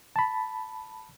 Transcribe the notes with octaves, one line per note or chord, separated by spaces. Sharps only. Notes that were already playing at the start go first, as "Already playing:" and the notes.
A5 B5